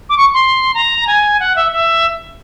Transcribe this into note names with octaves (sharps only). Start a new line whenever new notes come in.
D6
C#6
C6
A#5
G#5
F#5
E5
E5